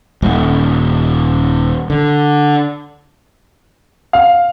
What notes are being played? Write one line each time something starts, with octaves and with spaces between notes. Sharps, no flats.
D#1
D3
F5